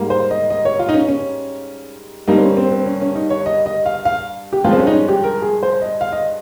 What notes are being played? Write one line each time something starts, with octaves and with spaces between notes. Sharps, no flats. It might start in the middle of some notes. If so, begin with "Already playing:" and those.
Already playing: G#2 G3 A#3
C5
D#5
D#5
C#5
F4
D#4
C#4
C#4
G2 G3 A#3 D#4
C4
C#4
C4
C4
C#4
C#4
D#4
C#5
D#5
D#5
F5
F5
G4
G2 F3 G#3 F4
C4
C#4
D#4
C#4
G4
A#4
G#4
C5
D#5
F5
D#5